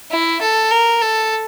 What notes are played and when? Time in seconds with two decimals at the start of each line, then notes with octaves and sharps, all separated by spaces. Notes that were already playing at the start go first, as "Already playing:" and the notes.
0.11 E4
0.41 A4
0.71 A#4
1.01 A4